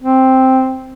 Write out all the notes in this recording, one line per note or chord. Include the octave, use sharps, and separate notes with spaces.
C4